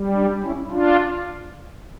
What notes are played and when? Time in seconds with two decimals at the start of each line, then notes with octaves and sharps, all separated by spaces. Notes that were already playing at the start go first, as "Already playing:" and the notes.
Already playing: G3
0.14 D4
0.43 C#4 E4
0.71 D4 F4